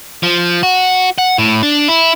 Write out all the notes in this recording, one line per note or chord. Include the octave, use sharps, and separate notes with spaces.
F3
F#4
F#5
A2
D4
E4